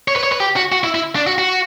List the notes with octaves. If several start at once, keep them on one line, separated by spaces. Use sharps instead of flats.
C#5
B4
C#5
B4
G4
F#4
F#4
E4
E4
D4
F#4
F#4